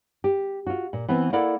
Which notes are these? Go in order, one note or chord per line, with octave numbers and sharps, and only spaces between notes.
G4
F4 F#4
A#2
E3 B3 C4
A#3 E4 A4 A#4 D5 F#5